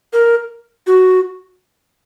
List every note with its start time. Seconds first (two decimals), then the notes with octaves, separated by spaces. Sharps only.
0.13 A#4
0.87 F#4